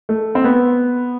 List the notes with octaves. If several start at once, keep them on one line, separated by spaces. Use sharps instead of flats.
A3
C4
B3